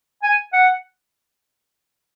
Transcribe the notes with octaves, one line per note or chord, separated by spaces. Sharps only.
G#5
F#5